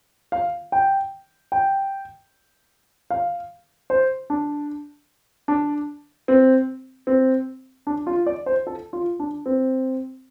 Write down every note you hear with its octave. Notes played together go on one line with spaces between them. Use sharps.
F5
G5
G5
F5
C5
D4
D4
C4
C4
D4
F4
D5
C5
A4
F4
D4
C4